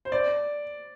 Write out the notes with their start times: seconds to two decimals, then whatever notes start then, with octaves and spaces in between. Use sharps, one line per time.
0.05 C5
0.12 D5